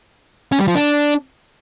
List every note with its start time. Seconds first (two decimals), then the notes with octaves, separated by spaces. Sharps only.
0.52 C#4
0.60 G3
0.68 F3
0.75 D4